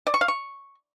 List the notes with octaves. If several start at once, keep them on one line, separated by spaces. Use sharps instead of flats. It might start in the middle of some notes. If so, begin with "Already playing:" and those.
D5
C#6
F5
C#6